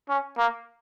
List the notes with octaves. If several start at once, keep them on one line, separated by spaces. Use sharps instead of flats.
C#4
A#3